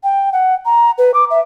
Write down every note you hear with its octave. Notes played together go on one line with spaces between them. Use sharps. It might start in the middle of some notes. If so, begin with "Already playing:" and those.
G5
F#5
A#5
B4
D6
E5